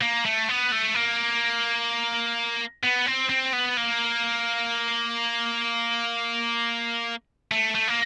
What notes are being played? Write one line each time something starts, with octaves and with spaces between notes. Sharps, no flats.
A#3
A3
B3
A3
A#3
B3
C4
C4
B3
A#3
A3
A3
A#3